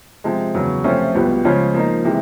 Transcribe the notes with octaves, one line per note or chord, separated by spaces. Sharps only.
C3 F3 G#3
E2 C#3 F#3
C3 F3 A3 C#4 F4
C#2 B2 G3 B3
C#3 F3 G#3 C#4
F3 A#3 D#4
C3 E3 G#3